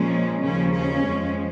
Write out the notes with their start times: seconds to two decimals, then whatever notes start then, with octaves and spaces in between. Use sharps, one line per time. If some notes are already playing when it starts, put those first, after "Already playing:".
Already playing: A#2 F3 G#3 C#4
0.43 D#2 C#3 F3 C#4
0.74 C#4
1.03 F2 F3 G#3